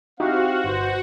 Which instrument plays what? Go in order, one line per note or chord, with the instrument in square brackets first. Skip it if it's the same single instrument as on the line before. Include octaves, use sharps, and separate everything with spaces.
[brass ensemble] C4 F5 [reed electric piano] D#4 E4 G4 [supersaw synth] F#4
[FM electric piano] G1 [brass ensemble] B2 C5